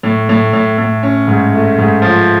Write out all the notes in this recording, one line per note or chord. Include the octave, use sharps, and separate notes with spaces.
A2
A2
A2
A2
C#4
G#2
A3
G#2
F3